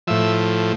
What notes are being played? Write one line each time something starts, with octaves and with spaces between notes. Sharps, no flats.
A2 F3 E5